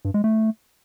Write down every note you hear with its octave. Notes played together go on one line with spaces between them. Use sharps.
G2
G#3
A3